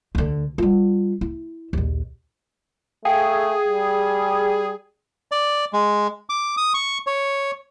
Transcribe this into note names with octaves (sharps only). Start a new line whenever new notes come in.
D2 D3
G3 F4
E4
A#1 D#2
A3 G#4 F5 G5
G3
D5
G#3
D6
D#6
C#6
C#5